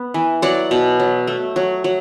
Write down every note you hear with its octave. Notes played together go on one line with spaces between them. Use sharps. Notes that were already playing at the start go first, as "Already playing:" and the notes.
Already playing: B3
E3
F#3 D5 F#5
B2
F#3
A3
F#3
F#3